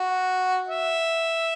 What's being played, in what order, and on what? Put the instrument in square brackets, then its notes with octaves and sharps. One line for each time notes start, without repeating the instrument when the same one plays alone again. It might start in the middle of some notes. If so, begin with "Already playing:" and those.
Already playing: [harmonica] F#4
E5